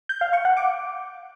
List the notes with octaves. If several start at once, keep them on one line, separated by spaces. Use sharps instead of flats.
G6
F5
C#6
F#5
D6